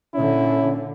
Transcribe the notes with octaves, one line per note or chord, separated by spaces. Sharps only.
A#2 D3 C#4 E4